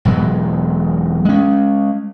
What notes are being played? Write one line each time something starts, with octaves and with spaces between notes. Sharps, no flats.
E1 B2 F#3 G#3
G#3 C#4